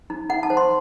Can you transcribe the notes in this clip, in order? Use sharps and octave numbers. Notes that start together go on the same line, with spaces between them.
D#4
D#4 F#5
A5
C5
C6